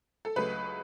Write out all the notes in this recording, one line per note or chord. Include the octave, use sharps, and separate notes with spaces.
A4
C#2 C#3 F#3 A3 B4